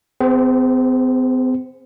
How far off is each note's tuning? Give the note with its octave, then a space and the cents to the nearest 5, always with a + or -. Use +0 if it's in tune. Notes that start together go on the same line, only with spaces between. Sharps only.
C4 -45 G#4 +0 C5 +0